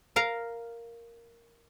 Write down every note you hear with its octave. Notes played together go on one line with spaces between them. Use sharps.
A#4 F5 A#5